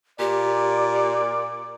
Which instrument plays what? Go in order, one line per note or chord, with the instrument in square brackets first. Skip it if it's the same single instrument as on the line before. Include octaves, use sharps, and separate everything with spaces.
[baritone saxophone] A#2 [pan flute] G4 [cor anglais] D5